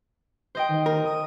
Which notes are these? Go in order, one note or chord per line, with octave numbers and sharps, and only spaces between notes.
C5 D#5 G5
D#3
A#4
D#6